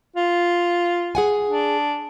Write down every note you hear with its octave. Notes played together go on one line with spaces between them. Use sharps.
F4
G#4 F#5 G#5
D4